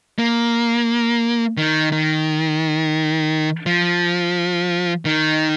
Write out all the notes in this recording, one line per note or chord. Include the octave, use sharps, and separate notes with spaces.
A#3
D#3
D#3
F3
D#3